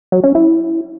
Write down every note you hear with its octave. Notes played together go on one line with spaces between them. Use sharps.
F#3
C#4
E4